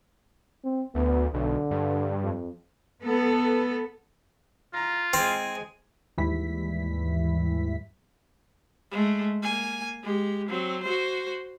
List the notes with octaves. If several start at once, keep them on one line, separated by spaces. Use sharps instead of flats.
C4
D2 B3
B1 D3
G2
F2
B3 A4
F4 A#5
G#3 C4 G#5
D#2 G#2 E3 G3 E4 B6
G#3 A3
A#3 G#5
G#3 G4
F#3 C4
F#4 C5